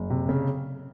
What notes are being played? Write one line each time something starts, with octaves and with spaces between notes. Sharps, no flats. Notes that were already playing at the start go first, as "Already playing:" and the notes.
Already playing: F#1
C3
C#3